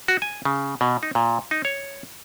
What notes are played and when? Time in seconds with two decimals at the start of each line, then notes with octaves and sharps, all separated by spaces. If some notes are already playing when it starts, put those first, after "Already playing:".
0.08 F#4
0.22 G#5
0.45 C#3
0.81 B2
1.03 D#4
1.15 A#2
1.51 D#4
1.65 C#5